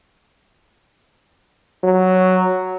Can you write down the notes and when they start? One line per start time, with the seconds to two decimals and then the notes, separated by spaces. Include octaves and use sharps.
1.84 F#3